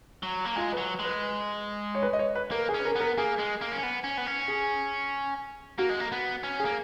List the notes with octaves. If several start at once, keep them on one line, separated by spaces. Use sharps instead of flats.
F#3
A#3
G#3 F4
B4
F#3
G#3
B4
C#5
B4
D#5
C#5
B4
A#3 A#4
G#4
C#4
B4
A#4
B3 A#4
A#3 G#4
G#3
A#3
C#4
B3
C#4
B3
C#4
G#4
A#3 F#4
G#3
A#3
B3
C#4
G#4
A#3